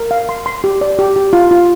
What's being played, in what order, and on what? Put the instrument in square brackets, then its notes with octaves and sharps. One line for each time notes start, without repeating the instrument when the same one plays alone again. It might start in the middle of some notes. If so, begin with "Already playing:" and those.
Already playing: [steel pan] A#4
F5
C6
C6
G4
D5
G4
G4
F4
F4